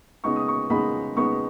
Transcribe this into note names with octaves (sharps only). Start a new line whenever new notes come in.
C#3 G#3 B3 D#4 C#6
D#6
C#6
C#3 G#3 B3 D#4 B5
C#3 G#3 B3 D#4 C#6